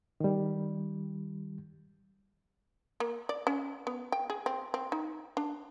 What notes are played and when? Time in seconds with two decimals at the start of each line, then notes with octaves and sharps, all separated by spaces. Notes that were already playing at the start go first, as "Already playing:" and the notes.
0.20 D#3 G3
3.00 A#3
3.29 D5
3.47 C#4
3.87 B3
4.12 G5
4.30 G#4
4.46 C4
4.74 C4
4.92 D#4
5.37 D4